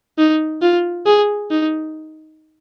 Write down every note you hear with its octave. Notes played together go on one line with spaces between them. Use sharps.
D#4
F4
G#4
D#4